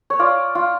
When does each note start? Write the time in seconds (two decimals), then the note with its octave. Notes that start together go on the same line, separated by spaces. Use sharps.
0.10 C#5
0.19 F4 D5
0.55 F4